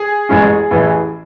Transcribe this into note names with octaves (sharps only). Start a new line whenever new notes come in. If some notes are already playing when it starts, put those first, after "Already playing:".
Already playing: G#4
A1 A2 G#3 C#4
A1 A2 E3